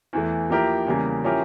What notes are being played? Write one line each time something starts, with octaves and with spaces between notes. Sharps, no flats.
E2 E3 A3
F3 A#3 E4 G4 A#4
E2 C#3 G3 A#3
F3 C#4 E4 G4 A#4